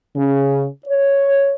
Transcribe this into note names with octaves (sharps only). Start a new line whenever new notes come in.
C#3
C#5